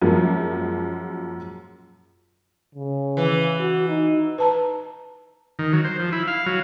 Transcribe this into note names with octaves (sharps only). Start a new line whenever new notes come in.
F#2 F3 F#3 G#3 A#3
C#3
E3
F#4
D#4
B4 A5 A#5
D#3
F#3
C5
F3
E4
F5
F#3